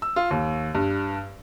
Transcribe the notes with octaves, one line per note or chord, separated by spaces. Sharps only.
E6
F4
D#2
G2